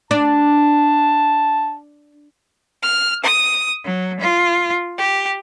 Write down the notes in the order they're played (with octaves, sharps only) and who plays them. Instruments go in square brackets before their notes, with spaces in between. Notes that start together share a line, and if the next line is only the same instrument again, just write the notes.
[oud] D4 [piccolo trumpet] A5
[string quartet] F6
D#6
F#3
F4
G4